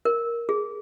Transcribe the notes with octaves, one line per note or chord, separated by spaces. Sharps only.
A#4
G#4